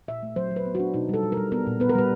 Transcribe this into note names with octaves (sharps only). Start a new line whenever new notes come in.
A#2 E5
A3
F#3 C5
F#3
B4
B3
F#4
D4
B2 D#4
G3 A4
G3
A#4
G3
B3 A#4
A#2
B3 B4
A#4
G3 B4